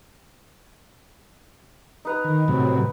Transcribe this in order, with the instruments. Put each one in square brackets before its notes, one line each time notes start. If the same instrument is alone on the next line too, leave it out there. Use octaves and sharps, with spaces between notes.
[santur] D#4 B4 A#5
[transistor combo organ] D#3
A2 C3 F#3